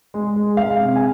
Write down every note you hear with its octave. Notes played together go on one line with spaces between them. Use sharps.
G#3
G#3
G#3 F5
C3
G#5